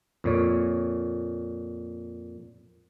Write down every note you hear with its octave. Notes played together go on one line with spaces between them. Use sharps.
F2 A#2 C#5